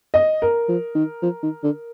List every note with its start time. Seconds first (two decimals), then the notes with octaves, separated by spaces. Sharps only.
0.14 D#5
0.42 A#4
0.69 F3
0.95 D#3
1.23 F3
1.43 D#3
1.64 D3